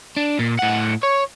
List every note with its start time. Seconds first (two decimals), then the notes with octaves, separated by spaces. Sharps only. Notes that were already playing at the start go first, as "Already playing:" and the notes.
0.17 D4
0.39 A#2
0.59 A2 F#5
1.03 C#5